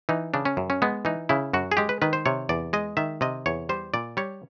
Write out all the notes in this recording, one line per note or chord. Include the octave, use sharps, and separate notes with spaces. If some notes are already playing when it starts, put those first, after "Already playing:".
E3 D#4
C#3 D4
C#4
F#2
C#4
G#3 B3
E3 D#4
C#3 E4
F#2 F#4
G#4
G#3 G4
B4
D#3 B4
C5
C3 C#5
E2 D5
G#3 D#5
D#3 E5
C3 D#5
E2 C#5
G3 C5
A#2 D5
G3 C#5